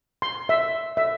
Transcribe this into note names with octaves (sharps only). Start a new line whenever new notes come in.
C6
E5
E5